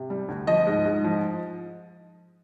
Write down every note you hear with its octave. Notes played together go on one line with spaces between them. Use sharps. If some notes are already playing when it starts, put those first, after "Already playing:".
Already playing: C3
G3
D2
F3 D#5
G#2
G#2
F3